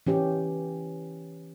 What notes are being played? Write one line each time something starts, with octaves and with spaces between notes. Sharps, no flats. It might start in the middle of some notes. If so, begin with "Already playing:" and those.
E3 C#4 G4